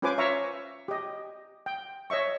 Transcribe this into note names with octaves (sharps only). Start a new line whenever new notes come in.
C#4 F4 B4 C5 G#5 D6
C#5 E5 F5 A#5 C#6
G4 D#5
G5
C#5 D#5 E5 C#6